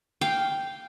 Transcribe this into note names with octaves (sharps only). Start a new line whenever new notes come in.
F5 G5